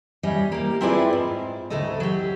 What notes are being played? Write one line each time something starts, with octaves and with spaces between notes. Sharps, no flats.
A2 G3 C#4 D#5
A#3 G4
C4 E4 F4 G#4 B4 D5
G#2
D2 A2 C#3 D#4 A4 D#5
F#3 G4